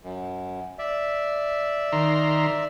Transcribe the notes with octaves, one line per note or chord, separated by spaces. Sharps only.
F#2
D5 E5
D#3 A#5 C6